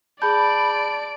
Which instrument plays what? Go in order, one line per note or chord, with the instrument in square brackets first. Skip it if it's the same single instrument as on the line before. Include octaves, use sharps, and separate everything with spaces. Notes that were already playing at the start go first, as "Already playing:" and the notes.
[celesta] G#4 G6 [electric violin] D5 D7 [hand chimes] A5 [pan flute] B5